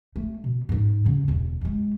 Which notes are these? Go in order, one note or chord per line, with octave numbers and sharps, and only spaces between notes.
A3
B2
G#2 D#4
F#2 C#3
E1 E2
F#2 G#3